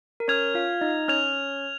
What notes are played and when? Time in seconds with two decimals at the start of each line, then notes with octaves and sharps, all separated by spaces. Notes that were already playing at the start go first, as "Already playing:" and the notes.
0.20 A#4
0.28 C#4 C#5 F6 G#6 F7
0.55 F4 F5
0.81 D#4 D#5
1.08 C#4 C#5 F6 G#6 F7